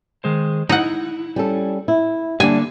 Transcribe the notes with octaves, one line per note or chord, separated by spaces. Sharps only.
D#3 G#3 C5
D#4 E4 F#5
G3 C#4 A4
E4
D3 G3 A#3 D4 G#5